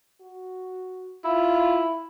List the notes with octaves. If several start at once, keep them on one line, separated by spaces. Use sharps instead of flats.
F#4
E4 F4